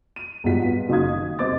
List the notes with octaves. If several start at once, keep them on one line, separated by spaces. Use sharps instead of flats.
D#7
B1 G#2 G3 F4 F#5 B6
B3 F4
F#1 D#4 F#4 F5 D#6 G#6
D#3
F1 C5 D#5 D6 A6